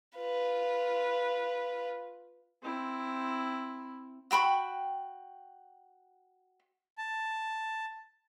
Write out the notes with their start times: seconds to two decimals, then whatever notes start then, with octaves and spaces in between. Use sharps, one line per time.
0.17 F4 B4
2.62 C4 E4
4.31 F#4 G5 B5 C#6
6.98 A5